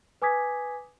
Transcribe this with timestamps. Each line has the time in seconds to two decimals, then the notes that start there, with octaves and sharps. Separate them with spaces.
0.22 B4 G#5 D6 D#6 G#6 B6